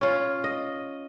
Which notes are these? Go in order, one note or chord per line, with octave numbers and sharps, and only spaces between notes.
C#4 F4
D#5